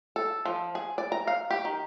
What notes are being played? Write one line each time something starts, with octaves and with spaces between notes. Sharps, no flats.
A4
F3
G#4
D5
A#5
F5
G4
D#3